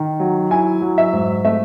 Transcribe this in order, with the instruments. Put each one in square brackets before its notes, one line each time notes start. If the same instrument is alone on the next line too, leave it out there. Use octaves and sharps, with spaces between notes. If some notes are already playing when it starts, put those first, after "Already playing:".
Already playing: [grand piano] D#3
F#3
[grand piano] E4 [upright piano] G#5
[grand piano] F#3
[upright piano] E5
[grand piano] G#2
[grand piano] A3 [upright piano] E5